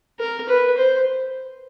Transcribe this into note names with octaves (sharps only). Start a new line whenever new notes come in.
A#4
B4
C5